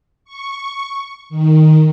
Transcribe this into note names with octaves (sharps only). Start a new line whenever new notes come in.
C#6
D#3